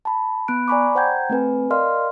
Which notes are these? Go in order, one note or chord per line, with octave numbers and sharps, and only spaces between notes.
A5 B5
B3 B5 F#6 D7
D5 G#5 A#5 B5 C#6 D6
C5 F#5 G5 A#5 G6 G#6
A3 C4 B4 G#5
A#4 D5 D#5 F5 C6 F6